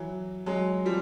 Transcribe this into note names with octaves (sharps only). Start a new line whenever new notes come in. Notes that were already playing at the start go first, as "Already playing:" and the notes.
Already playing: E3 F#3
F#3 G#3
F3 G3